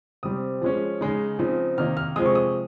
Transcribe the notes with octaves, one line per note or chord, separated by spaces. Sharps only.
C3 G3 C4 D#6
F3 G#3 C#4
C#3 G#3 D#4
C#3 F3 C4 D#4
C3 D#3 A#3 D#4 F6
F6
C3 F3 G#3 D#6
C#6
D#6